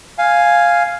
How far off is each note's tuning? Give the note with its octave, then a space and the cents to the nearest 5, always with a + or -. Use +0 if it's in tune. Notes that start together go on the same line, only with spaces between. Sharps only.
F5 +0 G#5 +0